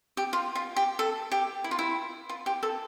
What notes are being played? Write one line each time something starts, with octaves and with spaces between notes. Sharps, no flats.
G4
F4
F4
G4
A4
G4
E4
F4
E4
F4
G4
A4